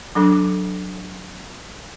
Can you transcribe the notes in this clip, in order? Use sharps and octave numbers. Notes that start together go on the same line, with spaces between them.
F#3 D4 A4 D6